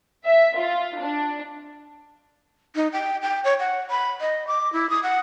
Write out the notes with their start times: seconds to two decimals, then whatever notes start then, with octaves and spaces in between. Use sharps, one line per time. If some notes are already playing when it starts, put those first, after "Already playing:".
0.24 E5
0.57 F4
0.99 D4
2.76 D#4
2.93 G5
3.22 G5
3.44 C#5
3.60 F#5
3.90 B5
4.21 D#5
4.47 D6
4.73 E4
4.90 D#6
5.03 F#5